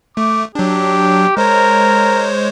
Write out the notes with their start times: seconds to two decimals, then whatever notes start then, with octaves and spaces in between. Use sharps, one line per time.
0.17 A3 D6
0.55 F#3 D4 G4
1.37 G#3 A#4 C5 C#5